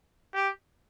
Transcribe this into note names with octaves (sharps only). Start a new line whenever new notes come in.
G4